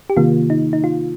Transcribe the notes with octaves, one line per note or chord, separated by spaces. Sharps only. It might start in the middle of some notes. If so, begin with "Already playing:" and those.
G4
C3 D#3 A#3 F4
D#4
D#4
F4